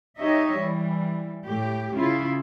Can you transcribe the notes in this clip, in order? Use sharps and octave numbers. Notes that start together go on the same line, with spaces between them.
D#4 G4 C#5 D#5 E5
E3 G3
A2 A3 G4
C#3 E4 F4